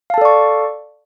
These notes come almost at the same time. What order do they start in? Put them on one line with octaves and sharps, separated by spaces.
F5 A5 A4 D5 C#6